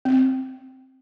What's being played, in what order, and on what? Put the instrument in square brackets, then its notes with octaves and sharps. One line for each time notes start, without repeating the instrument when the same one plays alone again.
[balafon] C4